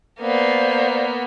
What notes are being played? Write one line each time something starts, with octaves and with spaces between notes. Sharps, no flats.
A#3 B3 C5 D5 F5